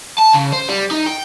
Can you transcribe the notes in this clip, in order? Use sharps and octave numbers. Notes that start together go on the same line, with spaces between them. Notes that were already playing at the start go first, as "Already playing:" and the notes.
A5
C#3
C5
G3
D#4
G5